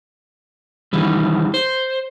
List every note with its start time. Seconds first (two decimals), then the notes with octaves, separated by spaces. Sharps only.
0.93 D#3 E3 G3
1.54 C5